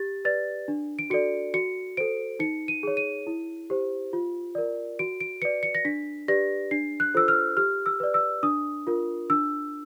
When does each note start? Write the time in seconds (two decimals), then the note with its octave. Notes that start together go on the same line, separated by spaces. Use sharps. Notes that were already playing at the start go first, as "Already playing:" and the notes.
Already playing: G4 A6
0.25 B4 D5 A6
0.68 D4
0.99 D7
1.10 F#4 A4 D5 C#7
1.54 F#4 C#7
1.97 A4 C5 D7
2.39 D#4 C#7
2.68 D#7
2.83 G#4 C#5
2.97 D#7
3.27 E4
3.70 G4 C5
4.13 F4
4.55 A#4 D5
4.99 F#4 D7
5.20 D7
5.42 B4 D5 C#7
5.63 C#7
5.75 A#6
5.85 D4 B6
6.28 G4 B4 D5 A#6
6.71 D4 C7
7.00 F#6
7.14 F4 A4 C5 E6
7.28 F6
7.57 G4 F6
7.86 E6
8.00 B4 D5
8.14 E6
8.43 D4 D#6
8.87 F4 A#4
9.30 D4 E6